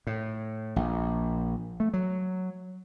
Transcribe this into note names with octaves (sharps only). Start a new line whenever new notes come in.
A2
A#1
A3
F#3